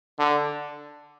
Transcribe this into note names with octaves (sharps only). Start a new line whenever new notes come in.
D3